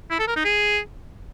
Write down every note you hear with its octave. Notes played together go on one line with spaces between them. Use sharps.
E4
A4
A#4
D#4
G#4